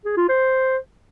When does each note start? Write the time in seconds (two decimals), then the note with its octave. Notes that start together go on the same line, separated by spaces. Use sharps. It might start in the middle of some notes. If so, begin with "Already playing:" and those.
0.05 G#4
0.17 F4
0.28 C5